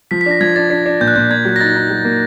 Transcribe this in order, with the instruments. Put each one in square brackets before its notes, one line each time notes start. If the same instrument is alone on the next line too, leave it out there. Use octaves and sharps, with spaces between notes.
[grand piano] F3 [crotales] B6
[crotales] B6
[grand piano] D4 [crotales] A#6
[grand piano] F3 [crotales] G#6
[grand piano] D4 [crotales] A6
[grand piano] D4 [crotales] B6
[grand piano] D4
[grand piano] A#2 [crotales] G6
[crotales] F#6
[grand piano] A#2 [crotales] G6
[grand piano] A#3 [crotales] G#6
[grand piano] F#3
[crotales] A#6
[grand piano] D#4 [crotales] A6
[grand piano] D#4
F#3
A#3